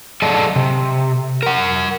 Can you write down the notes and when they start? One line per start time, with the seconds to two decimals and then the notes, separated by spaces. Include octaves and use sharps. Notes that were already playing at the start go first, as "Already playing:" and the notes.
0.22 F#3 G#4 A4 D5 D#5 A5
0.56 C3
1.43 A#4 F#5